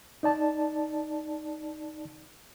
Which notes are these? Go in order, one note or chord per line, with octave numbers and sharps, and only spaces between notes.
D#4 D5 A5